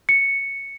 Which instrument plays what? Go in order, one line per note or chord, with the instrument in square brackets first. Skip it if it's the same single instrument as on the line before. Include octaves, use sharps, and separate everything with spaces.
[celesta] C#7